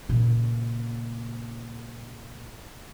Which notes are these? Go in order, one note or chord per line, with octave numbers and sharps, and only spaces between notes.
A#2 C#3